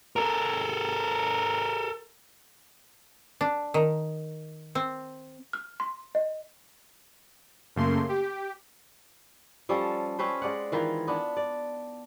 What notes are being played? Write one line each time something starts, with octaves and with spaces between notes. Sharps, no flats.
A4 A#4
D4
D#3
C4
F6
C6
D#5
F#2 C#3 A3 A#3 C6
G4
F3 G3 C#4 A4
C4 C#4 B4 C5
G#3 D5 F#5
D#3 E3 F4
B3 D4
D5